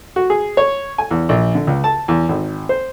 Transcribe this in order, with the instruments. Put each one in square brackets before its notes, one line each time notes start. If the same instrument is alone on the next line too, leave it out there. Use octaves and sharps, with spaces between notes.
[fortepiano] F#4
G#4
C#5
G#5
E2
A#1
D3
C#2
A5
E2
G#1
C5